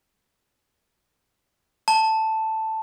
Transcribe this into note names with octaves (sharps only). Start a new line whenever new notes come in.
A5